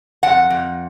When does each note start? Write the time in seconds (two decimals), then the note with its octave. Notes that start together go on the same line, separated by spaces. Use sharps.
0.23 F2 F#5
0.50 F2